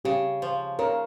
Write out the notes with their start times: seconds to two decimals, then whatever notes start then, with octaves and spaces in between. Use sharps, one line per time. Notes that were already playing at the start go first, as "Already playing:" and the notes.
0.05 C#3 E4 G4
0.42 F3
0.79 C#3 A#4 C#5